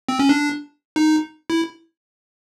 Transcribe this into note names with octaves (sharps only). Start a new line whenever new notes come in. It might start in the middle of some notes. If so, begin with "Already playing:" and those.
C4
C#4
D4
D#4
E4